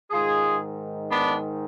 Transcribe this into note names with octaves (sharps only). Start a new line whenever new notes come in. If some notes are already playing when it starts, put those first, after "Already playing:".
G#2 D#3 F4 G#4
B3 D4